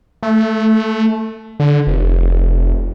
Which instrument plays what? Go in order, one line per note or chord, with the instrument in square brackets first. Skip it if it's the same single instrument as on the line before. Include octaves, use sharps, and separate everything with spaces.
[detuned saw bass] A3
D3
F1